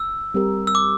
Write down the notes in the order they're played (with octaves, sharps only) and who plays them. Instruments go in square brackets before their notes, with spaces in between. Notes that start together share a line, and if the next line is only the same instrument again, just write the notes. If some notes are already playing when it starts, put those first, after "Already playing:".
Already playing: [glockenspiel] E6
[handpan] G3 C4 G4 A#4
[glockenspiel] E6
D6